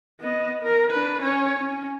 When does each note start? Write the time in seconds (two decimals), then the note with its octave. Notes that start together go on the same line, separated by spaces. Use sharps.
0.21 B3 D#5
0.63 A#4
0.92 D4 B4
1.22 C#4 C#5
1.60 C#4